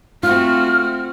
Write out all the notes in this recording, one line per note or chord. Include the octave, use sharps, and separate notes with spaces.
A3 C4 F4 F#4 F6